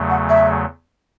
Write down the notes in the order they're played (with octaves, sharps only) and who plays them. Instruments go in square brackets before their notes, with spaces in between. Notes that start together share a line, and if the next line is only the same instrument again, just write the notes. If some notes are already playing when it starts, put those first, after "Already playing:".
Already playing: [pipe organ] E2 C#3 F#3 A3
[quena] F#5
E5